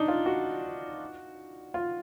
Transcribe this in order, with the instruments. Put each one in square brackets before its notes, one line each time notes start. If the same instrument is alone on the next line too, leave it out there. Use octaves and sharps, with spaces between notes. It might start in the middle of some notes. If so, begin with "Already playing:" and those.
Already playing: [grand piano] D4 D#4
F4
F#4
F4